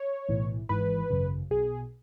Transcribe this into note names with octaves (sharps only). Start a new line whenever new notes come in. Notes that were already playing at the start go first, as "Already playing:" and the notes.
Already playing: C#5
B1 A2 E3
G#1 G#2 E3 B4
G#1 F#2 C#3
B1 B2 G#4